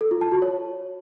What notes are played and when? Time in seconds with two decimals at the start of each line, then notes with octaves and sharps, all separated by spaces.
0.01 A4
0.11 F4
0.21 A5
0.32 F#4
0.42 C#5